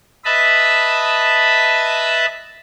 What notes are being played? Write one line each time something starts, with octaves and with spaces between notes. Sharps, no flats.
B4 D#5 E5 A5 B5